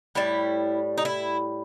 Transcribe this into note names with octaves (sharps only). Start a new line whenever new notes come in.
A2 G3 E4
D#4
E4